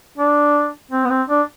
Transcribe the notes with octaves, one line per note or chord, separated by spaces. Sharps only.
D4
C4
B3
C4
D4